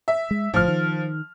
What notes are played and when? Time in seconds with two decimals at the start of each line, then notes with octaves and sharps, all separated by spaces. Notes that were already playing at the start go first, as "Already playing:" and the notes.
0.08 E5
0.31 G#3
0.54 G1 A2 F3 F6
0.68 D#3